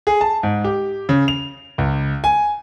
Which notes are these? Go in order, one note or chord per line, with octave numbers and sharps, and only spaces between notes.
G#4
A5
G#2
G4
C#3
F7
C#2
G#5